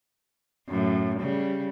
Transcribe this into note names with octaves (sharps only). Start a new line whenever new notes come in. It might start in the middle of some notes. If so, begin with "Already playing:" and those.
F#2 A2
C#3 G3